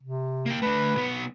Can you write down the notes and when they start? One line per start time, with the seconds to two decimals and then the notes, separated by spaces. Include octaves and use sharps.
0.03 C3
0.46 A#3 G5
0.62 A3 D4 B4
0.95 B1 B3